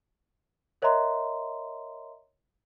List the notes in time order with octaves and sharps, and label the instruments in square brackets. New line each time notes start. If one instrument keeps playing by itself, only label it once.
[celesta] A#4 C#5 D#5 E5 A#5 C6